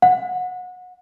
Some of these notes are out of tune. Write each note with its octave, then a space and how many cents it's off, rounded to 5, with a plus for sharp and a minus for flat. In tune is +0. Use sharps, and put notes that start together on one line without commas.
F#5 -25